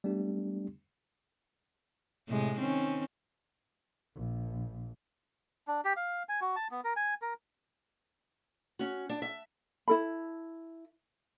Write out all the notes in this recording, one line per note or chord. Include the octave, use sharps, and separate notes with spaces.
G3 A3 B3 D4 G4
A2 C3 G#3
D#3 C4 C#4
A#1
D4
G4
F5
G#5
F#4
A5
B3
A#4
G#5
A#4
C#4 F#4
D4
E5
E4 A4 B5